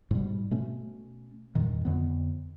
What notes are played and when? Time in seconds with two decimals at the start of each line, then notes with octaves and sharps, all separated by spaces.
0.11 G#2 B2 G3
0.51 B2 A3 C#4
1.55 E2 G2 A#2 D#3
1.85 F2 D3 B3